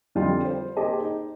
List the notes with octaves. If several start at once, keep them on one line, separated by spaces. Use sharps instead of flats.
F2 D3 G3 F4 D#5 G5
C5
A#3 G4 G#4 C5 D#5 A5
D#4